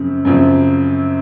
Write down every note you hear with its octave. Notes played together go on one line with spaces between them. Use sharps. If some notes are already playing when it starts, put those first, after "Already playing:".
Already playing: F#2 C#3 F3 C4
F#2 C#3 F3 C4 F4